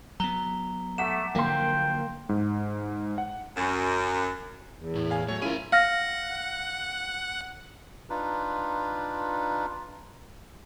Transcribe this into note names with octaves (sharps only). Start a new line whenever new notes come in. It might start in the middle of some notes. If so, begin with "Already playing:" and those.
F#3 B3 A#5 G7
A3 F#5 D6 B6 E7
D3 F3 F#3 A#3 G5 C6
G#2
F#5
F#2
E2
A2
F5 G#5
F#3 A3 C#5
C#4 E4 F4 G#4 A#4 D#7
F5 F#5 F6 A#6
D4 D#4 F4 B4